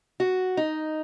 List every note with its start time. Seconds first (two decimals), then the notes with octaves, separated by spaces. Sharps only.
0.20 F#4
0.57 D#4